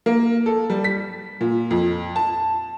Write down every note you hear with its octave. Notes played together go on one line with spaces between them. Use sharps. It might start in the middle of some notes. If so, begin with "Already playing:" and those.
A#3
A4
G3
B6
A#2
F2
A5